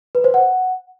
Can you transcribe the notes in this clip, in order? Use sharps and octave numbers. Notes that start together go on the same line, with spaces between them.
B4
C5
F#5